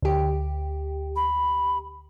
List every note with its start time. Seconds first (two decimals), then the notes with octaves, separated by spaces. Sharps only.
0.02 D2 G4
1.16 B5